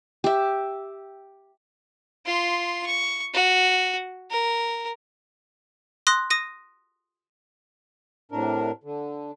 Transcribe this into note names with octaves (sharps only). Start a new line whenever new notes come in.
G4 E5
F4 C6
C#6
F#4
A#4
C6 D#6 F#6 A#6
D#6 A#6 D#7
A2 C3 D4 A#4
D3